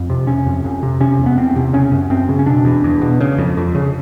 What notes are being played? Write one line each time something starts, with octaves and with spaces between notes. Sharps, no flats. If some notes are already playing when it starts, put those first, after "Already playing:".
Already playing: F2
C3
C3 C#4
F2
F2
C3
C3 C#4
E2
B3
E2 C4
C3
C#3 C#4
F#2
F#2 C4
C#3
C#4
B2 D4
E2
E2
B2
C#3
F2
F2
C#3